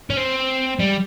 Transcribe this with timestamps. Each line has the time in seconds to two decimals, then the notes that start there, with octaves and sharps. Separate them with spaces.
0.10 C#4
0.17 C4
0.80 G3